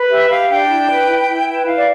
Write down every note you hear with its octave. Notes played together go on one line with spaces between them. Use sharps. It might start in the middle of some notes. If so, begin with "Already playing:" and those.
Already playing: B4
G4 E5
G4 F5
D4 G5
E4
B4
E4
E4
B4 G5
E4 F5
D5